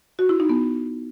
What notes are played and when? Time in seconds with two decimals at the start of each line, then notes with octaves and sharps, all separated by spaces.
0.19 F#4
0.29 E4
0.40 D#4
0.49 B3